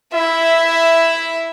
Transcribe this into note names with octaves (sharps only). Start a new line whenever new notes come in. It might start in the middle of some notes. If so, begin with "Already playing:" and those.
E4 E5